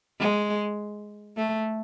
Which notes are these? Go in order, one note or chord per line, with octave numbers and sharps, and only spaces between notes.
G#3
A3